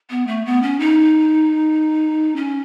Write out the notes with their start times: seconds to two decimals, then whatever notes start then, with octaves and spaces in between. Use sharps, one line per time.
0.10 B3
0.27 A3
0.45 B3
0.62 C#4
0.80 D#4
2.36 C#4